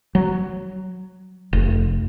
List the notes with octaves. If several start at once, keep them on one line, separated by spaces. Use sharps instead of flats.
F#3
F1